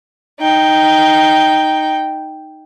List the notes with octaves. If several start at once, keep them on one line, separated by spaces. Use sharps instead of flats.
D#4 G5